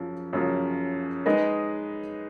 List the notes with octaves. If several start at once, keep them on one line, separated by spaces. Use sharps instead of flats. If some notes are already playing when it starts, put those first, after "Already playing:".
Already playing: F#2 C#3 F3
F#2 C#3 F3
G#3 D#4 G#4 B4 D#5